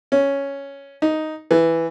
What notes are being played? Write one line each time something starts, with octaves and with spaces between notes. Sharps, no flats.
C#4
D#4
E3